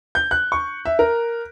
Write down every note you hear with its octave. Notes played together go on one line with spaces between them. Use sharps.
G6
F#6
C#6
E5
A#4